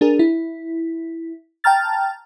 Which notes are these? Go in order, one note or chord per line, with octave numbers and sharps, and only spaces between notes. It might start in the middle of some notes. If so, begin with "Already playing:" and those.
D4 G#4 A#4
E4
G5 A5 A#5 F6 A6